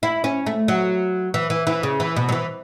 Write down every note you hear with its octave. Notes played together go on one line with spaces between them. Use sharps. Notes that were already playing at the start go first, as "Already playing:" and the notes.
E4
C#4
A3
F#3
E3
E3
E3
C#3
E3
B2
F#3
E3